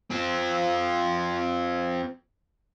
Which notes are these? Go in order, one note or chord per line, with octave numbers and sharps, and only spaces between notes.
C4 F4